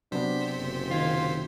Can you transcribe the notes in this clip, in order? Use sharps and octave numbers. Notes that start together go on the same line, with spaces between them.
C3 F#3 B3 D4 C5 B6
F#1
D#3 F4 G#6